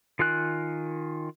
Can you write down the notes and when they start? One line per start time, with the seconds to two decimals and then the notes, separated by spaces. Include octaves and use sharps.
0.19 D#3 F4 A#4 G#5 F#6